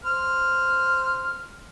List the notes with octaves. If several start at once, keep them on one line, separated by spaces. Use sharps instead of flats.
C5 F6